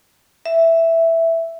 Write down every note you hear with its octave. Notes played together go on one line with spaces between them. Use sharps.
E5